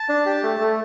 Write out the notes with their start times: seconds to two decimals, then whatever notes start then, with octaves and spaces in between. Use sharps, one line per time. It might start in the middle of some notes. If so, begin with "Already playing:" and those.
Already playing: A5
0.09 D4
0.26 G4
0.43 A3
0.60 A3